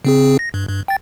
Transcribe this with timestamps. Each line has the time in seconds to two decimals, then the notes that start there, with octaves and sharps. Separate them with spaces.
0.05 C#3 C4 G#4
0.39 A#6
0.54 G2
0.69 G2
0.88 G5 A6